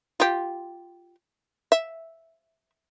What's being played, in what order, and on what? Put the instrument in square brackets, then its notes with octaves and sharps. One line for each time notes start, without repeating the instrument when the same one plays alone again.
[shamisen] F4 G4
E5